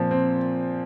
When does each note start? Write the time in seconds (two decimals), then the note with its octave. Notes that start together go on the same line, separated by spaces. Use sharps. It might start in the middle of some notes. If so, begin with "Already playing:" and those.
Already playing: A#2 F3 C4
0.11 C4